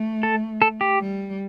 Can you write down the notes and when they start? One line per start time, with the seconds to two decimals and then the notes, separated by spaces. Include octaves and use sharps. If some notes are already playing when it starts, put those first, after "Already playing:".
Already playing: A3
0.23 A4
0.62 A4
0.81 G4
1.00 G3